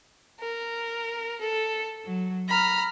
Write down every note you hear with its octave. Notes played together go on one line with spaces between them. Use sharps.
A#4
A4
F#3
A#5 B5 F6